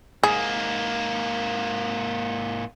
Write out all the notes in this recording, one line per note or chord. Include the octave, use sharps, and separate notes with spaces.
G#2 A#3 G#4